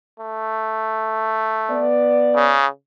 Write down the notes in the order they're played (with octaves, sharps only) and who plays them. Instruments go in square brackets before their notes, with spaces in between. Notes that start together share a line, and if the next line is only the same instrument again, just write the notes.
[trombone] A3
[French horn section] B3 D5
[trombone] C#3